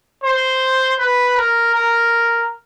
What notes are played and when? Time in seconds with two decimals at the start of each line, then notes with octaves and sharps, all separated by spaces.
0.23 C5
0.99 B4
1.37 A#4
1.75 A#4